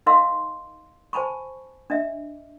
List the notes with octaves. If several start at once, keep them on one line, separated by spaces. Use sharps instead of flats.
D#4 A#4 D#5 F5 C6 E6
C5 G#5 A5 B5 C#6
D4 D#5 E5